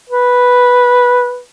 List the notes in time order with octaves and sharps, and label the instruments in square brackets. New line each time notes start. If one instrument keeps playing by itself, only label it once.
[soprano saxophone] B4